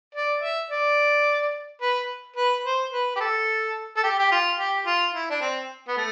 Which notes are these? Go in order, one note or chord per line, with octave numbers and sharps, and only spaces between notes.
D5
E5
D5
B4
B4
C5
B4
G4
A4
A4
G4
G4
F4
G4
F4
E4
D4
C4
B3
A3